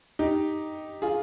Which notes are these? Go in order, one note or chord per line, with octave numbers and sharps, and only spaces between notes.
D#4 G4
F4 G#4